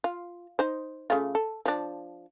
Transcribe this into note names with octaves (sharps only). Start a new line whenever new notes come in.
F4
D#4 C5
C#3 A3 F4
A4
F3 D4